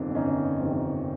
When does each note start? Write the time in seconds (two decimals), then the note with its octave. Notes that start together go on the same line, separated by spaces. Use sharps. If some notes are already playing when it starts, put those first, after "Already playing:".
Already playing: G1 F2 C3 D#3 D4
0.15 G1 C#4 D#4
0.60 F2 C3 D#3